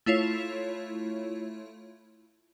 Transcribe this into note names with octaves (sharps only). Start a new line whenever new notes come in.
A3 E4 F4 C#5